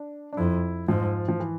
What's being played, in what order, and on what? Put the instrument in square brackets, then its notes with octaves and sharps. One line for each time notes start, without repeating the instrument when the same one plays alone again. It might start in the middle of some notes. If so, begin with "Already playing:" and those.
Already playing: [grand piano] D4
D4
[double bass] F2 [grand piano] E4
[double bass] G#2 [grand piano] F3
[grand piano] F3
E3